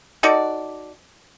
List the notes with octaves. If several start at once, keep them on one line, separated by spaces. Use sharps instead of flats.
D#4 F#4 A4 D5